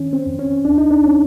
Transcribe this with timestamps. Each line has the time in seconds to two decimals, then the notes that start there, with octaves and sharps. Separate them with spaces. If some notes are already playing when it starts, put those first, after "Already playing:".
Already playing: D#3 C#4
0.13 C4
0.26 F2
0.39 C#4
0.65 D#2 D4
0.78 D#4
0.91 D4
1.04 C#4